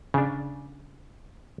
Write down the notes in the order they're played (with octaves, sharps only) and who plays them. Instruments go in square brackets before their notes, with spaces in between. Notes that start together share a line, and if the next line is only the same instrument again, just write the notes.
[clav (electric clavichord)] C#3 D4